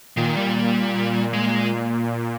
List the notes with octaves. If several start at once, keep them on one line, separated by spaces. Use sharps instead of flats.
A#2 D#3
G3
A#2
G#3